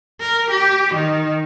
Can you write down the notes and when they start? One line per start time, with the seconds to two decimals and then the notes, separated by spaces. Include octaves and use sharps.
0.21 A#4
0.51 G4
0.94 D#3